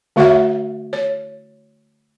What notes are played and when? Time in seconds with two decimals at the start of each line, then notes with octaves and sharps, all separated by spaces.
0.16 D3 A3 F#4 C#5 E5 F#5
0.93 C#5